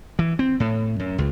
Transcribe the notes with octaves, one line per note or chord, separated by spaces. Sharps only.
E3
C4
A2
F#2
C#2